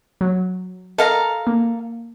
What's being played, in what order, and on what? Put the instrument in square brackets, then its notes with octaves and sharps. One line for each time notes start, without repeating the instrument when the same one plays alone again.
[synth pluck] F#3
[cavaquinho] A4 F5 A#5 [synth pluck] A#4 D#5
[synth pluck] A#3